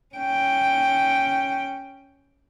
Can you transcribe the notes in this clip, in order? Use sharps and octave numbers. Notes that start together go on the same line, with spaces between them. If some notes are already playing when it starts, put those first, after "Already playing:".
C#4 G5